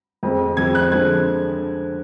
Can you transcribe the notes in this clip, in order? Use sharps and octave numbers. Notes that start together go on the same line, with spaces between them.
F2 F3 G#3
F2 F3 G#3 G#6
F#6
D3 F3 G#3 G#6